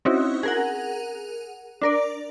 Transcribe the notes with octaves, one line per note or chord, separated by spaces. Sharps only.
C4 C#4 D#4 E4 F#4
G#4 A#4 F#5
D4 A#4 D5